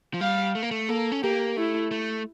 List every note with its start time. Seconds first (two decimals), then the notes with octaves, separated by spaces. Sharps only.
0.14 F3
0.21 G3 F5
0.55 A3
0.63 A#3
0.71 A3
0.89 A#3 A4
1.12 C#4
1.23 A#3 G4
1.57 A3 E4
1.91 A3